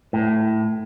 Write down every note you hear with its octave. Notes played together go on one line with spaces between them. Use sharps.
A2